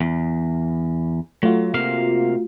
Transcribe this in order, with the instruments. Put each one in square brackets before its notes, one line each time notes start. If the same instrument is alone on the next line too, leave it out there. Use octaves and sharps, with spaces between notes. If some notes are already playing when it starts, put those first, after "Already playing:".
[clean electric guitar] E2
[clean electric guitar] F#3 [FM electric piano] A3 F4 F#4
[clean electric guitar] C3 A#3 F5